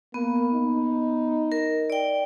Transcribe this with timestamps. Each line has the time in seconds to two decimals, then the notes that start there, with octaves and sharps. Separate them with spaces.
0.14 A#3 B3
0.53 D#4
1.52 A#4
1.90 D5 G5